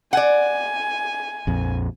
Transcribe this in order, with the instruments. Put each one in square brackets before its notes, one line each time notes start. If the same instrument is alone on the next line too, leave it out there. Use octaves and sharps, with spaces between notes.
[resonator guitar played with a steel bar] D5 F#5 [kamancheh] G#5
[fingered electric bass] A#1 F2